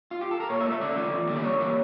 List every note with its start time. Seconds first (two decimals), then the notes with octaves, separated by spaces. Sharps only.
0.11 F4
0.21 G4
0.31 A4
0.40 A#4
0.50 A#2 C#5
0.60 E5
0.66 A3
0.71 E5
0.81 C#3 D5
0.97 F3 A3
1.13 E2
1.29 D3 G3 A#3
1.36 D5
1.45 G2 C#5
1.60 E3 G3 A#3